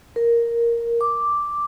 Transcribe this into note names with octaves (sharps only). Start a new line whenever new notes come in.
A#4
D6